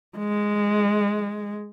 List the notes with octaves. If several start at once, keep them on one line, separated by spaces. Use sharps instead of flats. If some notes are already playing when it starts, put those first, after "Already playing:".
G#3